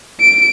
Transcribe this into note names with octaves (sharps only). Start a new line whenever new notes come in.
D7